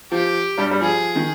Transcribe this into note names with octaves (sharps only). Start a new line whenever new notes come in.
F3 G4
G2 G3
G3
F3 G#4
D#3